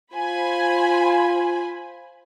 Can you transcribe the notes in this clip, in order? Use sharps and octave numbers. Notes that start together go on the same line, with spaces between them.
F4 C5 G#5 B5